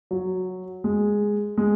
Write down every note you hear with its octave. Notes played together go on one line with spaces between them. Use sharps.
F#3
G#3
G#3